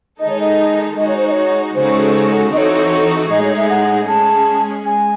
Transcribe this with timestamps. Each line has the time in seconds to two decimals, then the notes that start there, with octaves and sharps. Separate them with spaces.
0.19 D#3 G#3 D#4 A4 D#5
0.30 C#5
0.40 D#5
0.97 G#3 D#4 F#4 D#5
1.08 C#5
1.17 C5
1.27 D#5
1.31 C#5
1.75 C#3 G#3 D#4 F#4 A4 C5
2.53 E3 C4 D#4 F#4 A4 C#5 D#5
3.30 A2 G#3 D#4 G#4 D#5
3.44 C#5
3.57 E5
3.69 F#5
4.08 G#3 C#4 G#4 A5
4.86 G#3 G#5